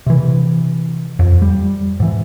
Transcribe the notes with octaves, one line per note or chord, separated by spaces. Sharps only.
C3 E3
F2
G3
G#2 E3